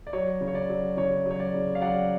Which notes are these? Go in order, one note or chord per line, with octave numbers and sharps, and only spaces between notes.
D5
F#3 C#5
C#3
C#5
D5
F#3
C#3 C#5
F#3
C#5
D5
C#3
F5
F#3 D5 F#5